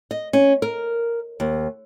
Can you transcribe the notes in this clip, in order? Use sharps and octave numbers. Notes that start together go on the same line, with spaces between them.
D#5
C#4
A#4
D#2